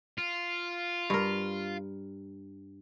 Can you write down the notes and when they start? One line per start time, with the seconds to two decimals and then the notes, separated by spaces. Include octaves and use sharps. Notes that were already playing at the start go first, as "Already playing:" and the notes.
0.18 F4
1.10 G2 A#4